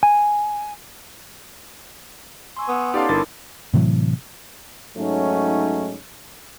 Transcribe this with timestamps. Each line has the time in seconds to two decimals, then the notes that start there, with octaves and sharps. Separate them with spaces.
0.03 G#5
2.57 G#5 C6 C#6 E6
2.69 B3 D#6 E6
2.94 C#4 D#4 G4 A4 D5 F5 C6 D6
3.09 G1 D4 E4 A#4 B5 A6
3.74 A2 C3 E3 F#3
4.97 G#2 F#3 A3 C#4 D#4